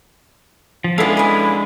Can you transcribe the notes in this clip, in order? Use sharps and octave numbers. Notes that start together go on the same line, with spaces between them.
F3
G#3 B3 C#4 D4 E4 G#4 A4 F5
D#5 G#5 B5